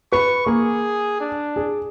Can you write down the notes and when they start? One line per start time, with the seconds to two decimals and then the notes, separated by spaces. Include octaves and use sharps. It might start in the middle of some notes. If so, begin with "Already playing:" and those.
0.12 B4 C#6
0.46 A#3 G#4
1.20 D4
1.56 G#4